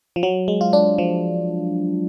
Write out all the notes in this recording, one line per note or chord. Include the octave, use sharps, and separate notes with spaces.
F3
F#3
G#3
F4
D4
F3